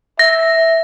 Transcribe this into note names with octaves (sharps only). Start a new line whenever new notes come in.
E5 A#6